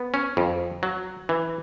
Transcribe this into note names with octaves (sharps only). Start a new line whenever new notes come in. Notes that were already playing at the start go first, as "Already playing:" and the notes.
Already playing: B3
C#4
F2
F#3
E3